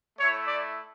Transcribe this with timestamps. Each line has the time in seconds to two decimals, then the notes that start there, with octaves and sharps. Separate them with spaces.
0.18 A3 E4 C#5
0.48 D5